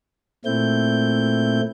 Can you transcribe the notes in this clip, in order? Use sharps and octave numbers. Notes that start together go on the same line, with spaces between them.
A#2 A3 C4 E4 G6